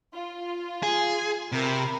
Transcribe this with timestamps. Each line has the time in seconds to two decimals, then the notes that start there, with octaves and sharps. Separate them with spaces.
0.14 F4
0.83 G#4
1.52 C3 A#4 B5